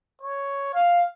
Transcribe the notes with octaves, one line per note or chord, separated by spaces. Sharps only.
C#5
F5